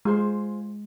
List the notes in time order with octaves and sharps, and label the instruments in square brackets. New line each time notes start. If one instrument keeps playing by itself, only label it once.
[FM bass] G#3 [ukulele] F4 G#4 C5